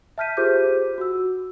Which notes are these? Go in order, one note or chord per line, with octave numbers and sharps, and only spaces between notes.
E5 A5 F6 G6 B6 D#7
F4 G4 G#4 C5 D6 G6
F#4 E6